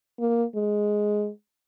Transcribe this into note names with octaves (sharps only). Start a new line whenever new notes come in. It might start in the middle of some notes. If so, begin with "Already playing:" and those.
A#3
G#3